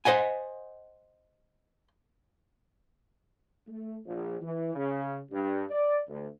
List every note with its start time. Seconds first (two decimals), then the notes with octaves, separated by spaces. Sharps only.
0.05 C5 D#5 F#5 G#5
3.67 A3
4.05 A#1
4.41 E3
4.75 C#3
5.31 G2
5.70 D5
6.08 D2